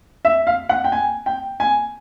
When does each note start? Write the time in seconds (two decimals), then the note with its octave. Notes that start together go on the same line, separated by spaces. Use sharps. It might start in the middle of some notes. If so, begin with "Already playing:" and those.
0.25 E5
0.47 F5
0.69 F#5
0.84 G5
0.92 G#5
1.26 G5
1.60 G#5